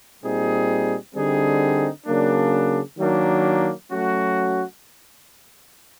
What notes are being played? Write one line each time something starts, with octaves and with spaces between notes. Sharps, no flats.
A#2 G3 C4 D#4 G#4
D3 G3 C4 D#4 G#4
C#3 F#3 A#3 D4
D#3 F#3 A#3 D4
F#3 A3 C#4 F#4